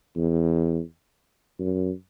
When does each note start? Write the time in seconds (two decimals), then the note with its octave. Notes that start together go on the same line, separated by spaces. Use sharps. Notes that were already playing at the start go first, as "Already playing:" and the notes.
0.16 E2
1.59 F#2